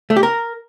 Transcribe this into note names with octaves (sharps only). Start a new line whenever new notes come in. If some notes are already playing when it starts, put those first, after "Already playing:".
A3
G4
A#4